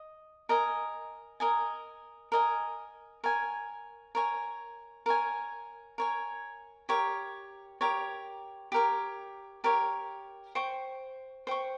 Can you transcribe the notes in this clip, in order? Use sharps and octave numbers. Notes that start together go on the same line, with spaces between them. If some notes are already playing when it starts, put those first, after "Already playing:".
Already playing: D#5
A#4 D#5 G#5
A#4 D#5 G#5
A#4 D#5 G#5
A#4 C#5 G#5
A#4 C#5 G#5
A#4 C#5 G#5
A#4 C#5 G#5
G4 A#4 C#5
G4 A#4 C#5
G4 A#4 C#5
G4 A#4 C#5
C5 G5 C#6
C5 G5 C#6